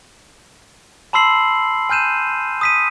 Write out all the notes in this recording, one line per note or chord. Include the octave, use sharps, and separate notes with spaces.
A5 B5 C6 E6 C7 F#7
G#5 F6 G6 D#7 E7
D#6 B6 D#7